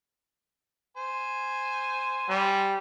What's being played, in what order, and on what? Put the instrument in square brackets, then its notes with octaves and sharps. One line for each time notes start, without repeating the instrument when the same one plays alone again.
[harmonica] C5 G#5
[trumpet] G3